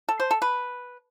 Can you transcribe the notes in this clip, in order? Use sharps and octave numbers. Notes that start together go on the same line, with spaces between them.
A4
C5
A4
B4